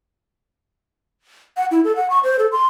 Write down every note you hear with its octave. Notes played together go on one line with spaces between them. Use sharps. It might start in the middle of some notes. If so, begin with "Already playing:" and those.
F#5
E4
A4
F#5
C#6
C5
A4
C6